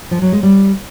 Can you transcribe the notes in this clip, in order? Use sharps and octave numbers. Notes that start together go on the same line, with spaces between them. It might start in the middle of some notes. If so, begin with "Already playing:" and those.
F3
F#3
G#3
G3